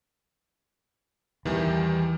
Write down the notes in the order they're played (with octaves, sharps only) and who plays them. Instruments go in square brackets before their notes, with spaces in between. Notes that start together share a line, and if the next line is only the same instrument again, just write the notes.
[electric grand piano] E2 D#3 G3 [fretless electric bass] E3